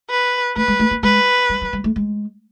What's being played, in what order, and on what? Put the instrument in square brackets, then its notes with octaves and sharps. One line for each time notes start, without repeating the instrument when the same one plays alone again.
[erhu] B4
[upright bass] A3 [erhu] B4
[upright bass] G#3
A3
A#3
[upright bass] G#3 [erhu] B4
[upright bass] G3
F#3
G3
A3
G#3